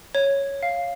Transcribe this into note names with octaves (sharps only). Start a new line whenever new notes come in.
C#5
F5